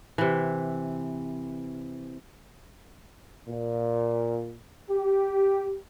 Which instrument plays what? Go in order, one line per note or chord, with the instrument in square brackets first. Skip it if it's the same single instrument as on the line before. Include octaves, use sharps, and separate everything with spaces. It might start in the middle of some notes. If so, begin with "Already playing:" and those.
[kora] C3 E3
[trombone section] A#2
G4